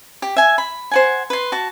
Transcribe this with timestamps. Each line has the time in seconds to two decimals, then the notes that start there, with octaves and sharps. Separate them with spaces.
0.22 G4
0.36 E5 G#5
0.58 B5
0.91 C5 F#5 G#5
1.30 B4 C6
1.52 F#4 A5